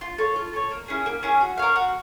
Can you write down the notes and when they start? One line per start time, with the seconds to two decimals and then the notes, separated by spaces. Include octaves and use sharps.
0.01 F4
0.18 A4 C#5
0.36 F4
0.53 A4 C#5
0.71 A#3
0.88 C#4 E4 G#4
1.06 A#3
1.23 C#4 E4 G#4
1.41 F#4
1.58 A#4 C#5 F5
1.76 F#4